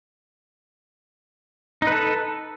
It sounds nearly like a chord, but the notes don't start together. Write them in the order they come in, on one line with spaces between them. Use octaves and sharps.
D#4 B4 A4